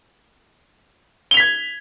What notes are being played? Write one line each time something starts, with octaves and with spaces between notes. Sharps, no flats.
G#6 B6 F7 G7